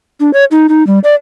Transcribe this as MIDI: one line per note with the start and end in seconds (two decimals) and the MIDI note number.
0.20 0.31 62
0.33 0.45 73
0.51 0.67 63
0.69 0.85 63
0.87 0.99 55
1.04 1.15 74